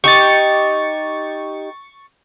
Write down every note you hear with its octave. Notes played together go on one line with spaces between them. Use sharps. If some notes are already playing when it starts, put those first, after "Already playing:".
D#4 G4 C#6 A6